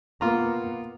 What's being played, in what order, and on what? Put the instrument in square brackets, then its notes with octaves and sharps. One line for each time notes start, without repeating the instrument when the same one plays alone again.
[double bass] A#3 B3 [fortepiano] F4 A#5